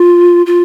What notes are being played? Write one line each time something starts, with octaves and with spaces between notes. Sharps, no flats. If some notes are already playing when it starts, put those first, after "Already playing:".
Already playing: F4
F4